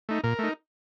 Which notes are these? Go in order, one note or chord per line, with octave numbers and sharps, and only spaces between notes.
A3 D#4
A#2 A#4
A3 D#4